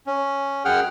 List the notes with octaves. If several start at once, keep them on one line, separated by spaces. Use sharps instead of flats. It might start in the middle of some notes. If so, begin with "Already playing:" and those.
C#4
F#2 G#4 F#5 G5 F6